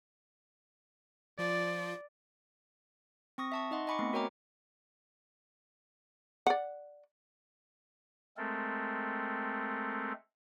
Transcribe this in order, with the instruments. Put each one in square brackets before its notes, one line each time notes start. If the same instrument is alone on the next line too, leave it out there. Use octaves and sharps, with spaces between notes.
[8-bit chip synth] F3 F4 [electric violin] D5
[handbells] C4 C#6 D#6 A#6
E5 A5 C#6
D#4 D#5 F#5 C6
D#5 G#5 B5 C#6 D6 C#7
A3 B3 C4
F#4 A#4 C#5 G5 A#5 D6
[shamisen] D5 F#5
[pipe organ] G#3 A3 C4 A4 A#4